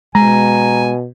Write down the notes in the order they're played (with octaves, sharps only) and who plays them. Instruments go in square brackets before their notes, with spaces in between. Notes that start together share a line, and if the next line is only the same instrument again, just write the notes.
[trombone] B2 [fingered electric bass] G#3 [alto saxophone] G#5 [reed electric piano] A#5